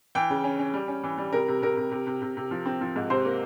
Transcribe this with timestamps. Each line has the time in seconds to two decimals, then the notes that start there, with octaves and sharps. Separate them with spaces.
0.15 E3 G5
0.30 C#3
0.44 C#4
0.59 C#4
0.74 G3
0.88 C#4
1.04 E3
1.18 G3
1.33 C3 A#4
1.48 C3
1.62 C3 A#4
1.77 C3
1.91 C3
2.07 C3
2.22 C3
2.37 C3
2.51 F3
2.66 C4
2.81 F3
2.96 G#2
3.10 C3 C5
3.25 A#3